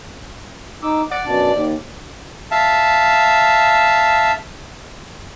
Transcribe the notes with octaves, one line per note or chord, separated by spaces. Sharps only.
D#4 D6 E6
D5 F#5
F#2 B2 D4
D#2
E5 F5 A5